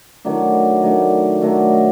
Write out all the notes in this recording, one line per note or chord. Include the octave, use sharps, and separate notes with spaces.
D#3 F#3 A3 D4
D#3 F#3 A3 D4
D#3 F#3 A3 D4